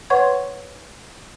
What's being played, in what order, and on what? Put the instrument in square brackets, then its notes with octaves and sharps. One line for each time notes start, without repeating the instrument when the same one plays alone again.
[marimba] B4 C#5 F#5 C6 C#6 G#6